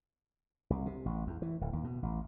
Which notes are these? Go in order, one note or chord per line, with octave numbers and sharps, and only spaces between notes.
C2
C3
A1
E2
E3
D1
D#2
B2
A1